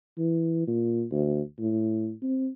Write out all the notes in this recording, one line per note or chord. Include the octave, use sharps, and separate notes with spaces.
E3
A#2
D2
A2
C4